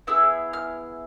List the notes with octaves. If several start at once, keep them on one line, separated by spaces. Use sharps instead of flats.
B3 E4 G#4 E6
F6